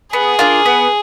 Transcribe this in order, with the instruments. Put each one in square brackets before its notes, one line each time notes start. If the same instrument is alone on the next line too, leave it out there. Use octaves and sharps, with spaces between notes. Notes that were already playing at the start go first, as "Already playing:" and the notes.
[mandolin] B3 [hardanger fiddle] G#4
[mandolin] D4 F4 A#4
B3